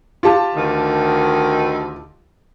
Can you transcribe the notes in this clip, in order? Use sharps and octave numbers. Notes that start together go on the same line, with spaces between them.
F4 G4 A5
D2 D#3